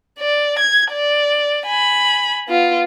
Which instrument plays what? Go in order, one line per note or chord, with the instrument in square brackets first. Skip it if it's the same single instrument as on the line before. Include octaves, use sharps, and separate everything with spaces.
[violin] D5
G#6
D5
G#5 B5
B3 F4